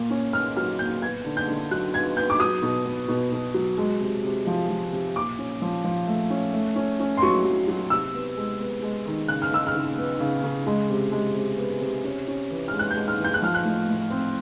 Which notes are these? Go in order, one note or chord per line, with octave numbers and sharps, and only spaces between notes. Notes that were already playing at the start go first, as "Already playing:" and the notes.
Already playing: A#2 A#3
C#4
A#3 F6
F#3 F6
A#2 G6
B3 G#6
D3
G6
D3
F#3 F#6
B3 G#6
B3 G6
D6
F#3 D#6
B2
B3
B2
B2
F#3
G#3
C3
C3
F3
F3
C3
A#2 D6
C#4
F3
F3
A3
C#4
A3
C#4
C#4
C6
F#3 C#6
F#3
F#3
C3 E6
B3
G#3
B3
G#3
D#3
C#3 F#6
F6
C#3 E6
F6
C#3
B3
C#3
C#3
G#3
C3
G#3
C3
B3
C3
C#4
C#4
E3
G#3 F6
F#6
G#3 G6
F6
E3
G6
F#6
F3 F6
F#6
A2
A2
C4